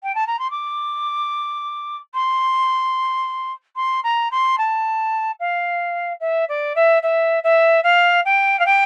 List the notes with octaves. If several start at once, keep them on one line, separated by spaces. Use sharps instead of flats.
G5
A5
A#5
C6
D6
C6
C6
A#5
C6
A5
F5
E5
D5
E5
E5
E5
F5
G5
F5
G5